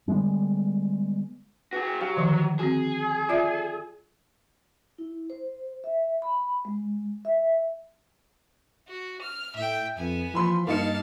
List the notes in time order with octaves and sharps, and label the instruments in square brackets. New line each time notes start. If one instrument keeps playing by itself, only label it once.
[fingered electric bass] D3 G3 G#3 B3
[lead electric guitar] F#4 G#4 [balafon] B4
[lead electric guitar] F#3 [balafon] G4 F5
[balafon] D3 D#3 F3
[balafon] C4 F#4 [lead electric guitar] G#4
[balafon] F4 D5 E5
[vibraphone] E4
C5
E5
B5
G#3
E5
[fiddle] F#4
F6
[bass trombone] A2 [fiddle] E5 G5
[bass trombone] F2 [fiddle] B3 G#5
[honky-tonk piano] E3 B5 C6 [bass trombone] F3
[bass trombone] G2 [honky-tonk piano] A#3 D#4 C#7 [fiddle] F5 A5